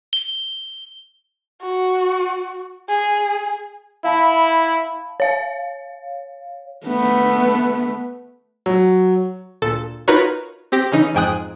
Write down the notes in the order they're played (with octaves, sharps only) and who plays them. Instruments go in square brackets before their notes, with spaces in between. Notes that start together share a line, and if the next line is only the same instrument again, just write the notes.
[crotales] G7
[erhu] F#4
G#4
[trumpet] E4 [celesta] F5 A5 B5
[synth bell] C#5 F5
[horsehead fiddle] A3 B3
[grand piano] F#3
[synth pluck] D2 A#2 A4
D#4 F4 F#4 A#4 B4 C#5
C4 G4 A#6 D7
C#3 E3 C#4 D#4
F2 G#2 G5 G#5 D#6 F#6